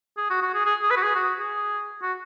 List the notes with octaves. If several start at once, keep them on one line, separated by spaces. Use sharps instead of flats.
G#4
F#4
F#4
G#4
G#4
G#4
B4
F#4
G#4
F#4
G#4
F#4